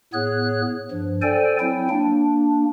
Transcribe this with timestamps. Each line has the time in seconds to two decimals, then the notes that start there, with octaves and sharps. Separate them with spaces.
0.13 A2 B3 G#4 C#5 F#6
0.91 G2 F3
1.22 A4 C5 D5 G5 G#5
1.60 F#3 C4 E4 G5
1.89 A#3 D4